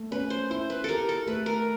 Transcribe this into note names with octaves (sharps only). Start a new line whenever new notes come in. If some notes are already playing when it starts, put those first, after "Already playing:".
Already playing: A3
C#4 B4
C5
E4 C5
B4
G4 A4 A#4
A4
A3 B4
A#4